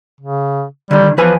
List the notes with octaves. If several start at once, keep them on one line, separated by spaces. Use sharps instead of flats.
C#3
D3 D#3 G3
E2 F3 B4 G#5